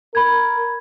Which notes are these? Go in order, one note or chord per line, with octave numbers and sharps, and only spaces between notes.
A#4 B5 G#6